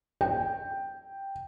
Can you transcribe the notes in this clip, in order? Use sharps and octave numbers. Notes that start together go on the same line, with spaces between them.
G5